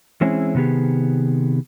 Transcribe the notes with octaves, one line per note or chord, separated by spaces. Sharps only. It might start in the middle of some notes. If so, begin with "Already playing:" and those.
E3 G#3 C4 C#4 E4 G#4
C3 D#3 B3 G4 G#4